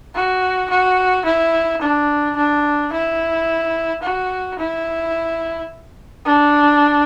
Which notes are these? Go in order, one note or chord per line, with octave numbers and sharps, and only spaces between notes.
F#4
F#4
E4
D4
D4
E4
F#4
E4
D4